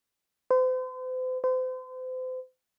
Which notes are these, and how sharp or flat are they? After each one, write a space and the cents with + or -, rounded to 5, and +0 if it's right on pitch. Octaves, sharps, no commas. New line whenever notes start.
C5 -40
C5 -35